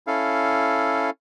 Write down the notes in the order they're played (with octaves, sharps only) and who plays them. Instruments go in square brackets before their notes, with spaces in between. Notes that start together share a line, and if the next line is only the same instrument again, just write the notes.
[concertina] C#4 E4 A4 F5